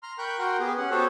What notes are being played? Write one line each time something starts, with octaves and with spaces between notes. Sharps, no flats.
A#5 C6 F6
A#4 G5 B5 C#6 F#6 G6
F#4 A#4 F#5 G5 A#5 C6
B3 G4 G#4
C#4 F#5
B3 F#4 G4 A4 C5 C#5